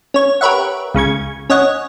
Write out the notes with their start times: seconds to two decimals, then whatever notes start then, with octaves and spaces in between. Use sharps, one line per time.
0.14 C#4 C#5
0.41 G4 A#4 B4 C#5 E5 F#5
0.94 C#2 C#3 C#6 G#6
1.50 C#4 C#5 D#5 F#5